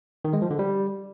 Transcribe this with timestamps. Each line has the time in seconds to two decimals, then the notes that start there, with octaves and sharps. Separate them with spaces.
0.25 D#3
0.33 G#3
0.42 F3
0.50 D3
0.59 G3